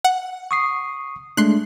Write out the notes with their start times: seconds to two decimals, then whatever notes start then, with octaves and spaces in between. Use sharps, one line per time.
0.04 F#5
0.51 C#6 D#6 C7
1.37 G#3 A3 D4 C6 F#6